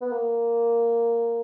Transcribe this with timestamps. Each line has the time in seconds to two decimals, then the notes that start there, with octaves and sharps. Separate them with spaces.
0.01 B3
0.12 A#3